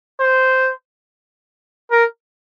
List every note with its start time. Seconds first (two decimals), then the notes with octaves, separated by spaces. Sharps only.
0.20 C5
1.91 A#4